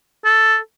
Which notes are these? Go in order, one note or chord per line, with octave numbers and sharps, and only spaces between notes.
A4